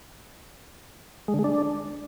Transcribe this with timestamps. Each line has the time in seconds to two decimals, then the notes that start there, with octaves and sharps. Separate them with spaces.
1.28 G#3
1.33 D3
1.39 G#3
1.44 D4